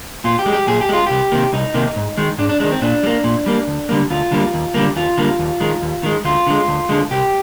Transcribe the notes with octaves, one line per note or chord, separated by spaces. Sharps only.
A#2 F4
G4
G#3
G4
A#2 G#4
G4
G#3 F4
C2 G4
C3 D#3 A#3
C2 D#4
C3 D#3 A#3
G#2
D#3 G#3
G#2 D4
D4
D#3 G#3 D4
C4
A#2 D4
G3
A#3
A#2
G3 A#3
D2
D3 G3 A#3
D2 F4
D3 G3 A#3
D#2
D3 G3 A#3
D#2 F4
D3 G3 A#3
D#2
D#3 G#3
D#2
D#3 G#3
D2 F4
D3 G#3
D2
D3 G#3
C2 G4